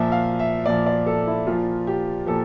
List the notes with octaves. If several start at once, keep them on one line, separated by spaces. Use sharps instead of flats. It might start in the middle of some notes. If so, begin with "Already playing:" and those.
Already playing: A#2 F3 E5
F5
E5
A#2 F3 D5
D5
A4
E4
A#2 F3 F4
G4
A#2 F3 A4